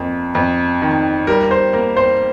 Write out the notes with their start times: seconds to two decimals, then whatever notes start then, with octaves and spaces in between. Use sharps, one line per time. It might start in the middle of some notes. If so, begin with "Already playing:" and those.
Already playing: F2 A#3
0.35 F2
0.82 D#3
1.27 G3 A#4
1.41 A#4
1.51 C5
1.73 A#3
1.97 C5